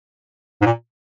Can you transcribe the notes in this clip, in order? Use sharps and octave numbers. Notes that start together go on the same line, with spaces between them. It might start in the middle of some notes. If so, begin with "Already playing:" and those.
G#2
A#2